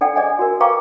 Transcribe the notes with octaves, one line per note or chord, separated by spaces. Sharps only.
D4 A4 D5 F#5 G5
G#4 D5 D#5 F#5 G#5
F#4 A#4
B4 F5 G5 A#5 C#6 D6